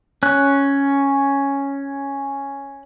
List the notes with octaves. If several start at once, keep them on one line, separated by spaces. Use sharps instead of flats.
C#4 F#6